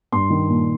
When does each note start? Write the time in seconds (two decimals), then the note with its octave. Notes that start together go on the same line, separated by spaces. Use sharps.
0.12 G2 C6
0.30 D#3
0.49 A#2